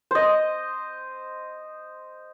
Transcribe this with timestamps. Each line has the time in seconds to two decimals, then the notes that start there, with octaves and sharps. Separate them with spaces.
0.11 C5 D#5